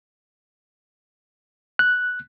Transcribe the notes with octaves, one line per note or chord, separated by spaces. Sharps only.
F#6